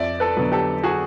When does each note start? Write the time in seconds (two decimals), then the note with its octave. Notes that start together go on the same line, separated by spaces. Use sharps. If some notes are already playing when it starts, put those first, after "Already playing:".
Already playing: F2 D5 E5
0.20 A4 B4
0.37 D3 F#3 B3
0.51 G4 A4
0.83 F#4 G#4